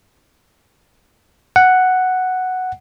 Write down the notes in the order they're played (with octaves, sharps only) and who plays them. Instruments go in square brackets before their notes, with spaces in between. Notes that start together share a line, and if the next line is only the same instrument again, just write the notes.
[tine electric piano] F#5